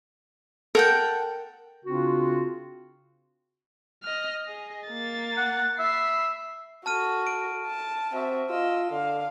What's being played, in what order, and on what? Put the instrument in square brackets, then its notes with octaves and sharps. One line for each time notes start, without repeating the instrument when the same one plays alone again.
[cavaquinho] A4 F#5 G5 [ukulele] A#4
[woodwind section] C#3 C4 D4 F4 F#4
[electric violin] D#5 F6
G#4 D#5
A#3 A6
[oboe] F#5
[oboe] E5 [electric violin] B5 C7
[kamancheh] F#4 A4 [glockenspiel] A5 F6 D#7
[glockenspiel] D7
[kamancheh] A5
[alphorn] C4 [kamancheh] F#4 E5
[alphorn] F4 [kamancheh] D#5 E6
[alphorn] D3 [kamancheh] F5